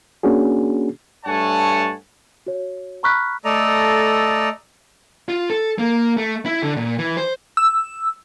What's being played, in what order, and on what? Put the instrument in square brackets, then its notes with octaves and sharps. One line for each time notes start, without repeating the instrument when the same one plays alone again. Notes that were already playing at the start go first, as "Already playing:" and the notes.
[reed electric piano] A#3 C#4 D4 F#4 G#4
[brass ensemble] G2 A3 C#5 F#5 G#5 A5
[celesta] F#4 C#5
A#5 B5 C#6 F6 F#6 B6
[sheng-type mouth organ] A3 A4 D5 D#5 A#5
[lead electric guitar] F4
A4
A#3
A3
E4
D3
A#2
E3
C5
[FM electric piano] E6